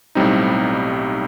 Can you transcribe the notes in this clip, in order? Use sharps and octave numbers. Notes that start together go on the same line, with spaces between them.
B1 A2 G3 C4 D#4